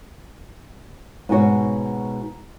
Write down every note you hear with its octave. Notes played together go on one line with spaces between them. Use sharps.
G#2 B2 F#4 C#5